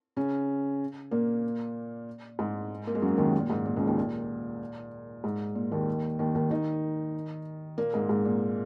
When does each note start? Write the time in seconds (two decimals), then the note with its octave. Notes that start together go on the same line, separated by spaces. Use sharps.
0.16 C#3 C#4
1.11 A#2 A#3
2.39 G#2 G#3
2.87 A#3
2.95 G#3
3.02 F#2 F#3
3.18 D#2 D#3
3.40 A#2
3.50 G#2
3.66 A#2
3.76 C#2 C#3
3.87 D#2 D#3
3.97 A#2
5.24 G#2
5.55 A#2
5.71 D#2 D#3
6.19 D#2 D#3
6.35 D#2 D#3
6.50 D#3 D#4
7.78 A#2 A#3
7.94 G#2 G#3
8.09 G#2
8.25 A#2